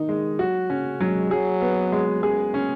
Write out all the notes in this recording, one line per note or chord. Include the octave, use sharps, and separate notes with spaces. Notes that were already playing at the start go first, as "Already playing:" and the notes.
Already playing: D#3 D#4
G#3
F#3 F#4
C#3 C#4
F#3 G#3
F#3 G#4
B3
G#3
F#2 G#4
C#4